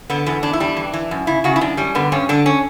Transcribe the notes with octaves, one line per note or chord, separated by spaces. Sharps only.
D3 B3
E2 B3
E2 D4
E4
G3 D4
E3
E3
F#2
C#3 E4
C#3 F#4
E4
F#2 D4
G3 C#4
D3 B3
G2 C#4
D3 D4
C#4